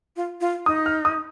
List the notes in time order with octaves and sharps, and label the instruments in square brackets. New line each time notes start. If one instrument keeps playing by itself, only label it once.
[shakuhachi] F4
F4
[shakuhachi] D#4 [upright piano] D#6
[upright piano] F6
D#6